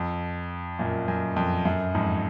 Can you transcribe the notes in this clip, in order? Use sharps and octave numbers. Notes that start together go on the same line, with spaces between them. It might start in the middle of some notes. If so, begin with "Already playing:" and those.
Already playing: F2
F#2 A#2
F#2
F2
F#2
F2 G#2